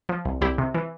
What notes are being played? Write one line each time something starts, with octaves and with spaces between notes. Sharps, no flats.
F3
C2
C2 E4 G4
C3
E3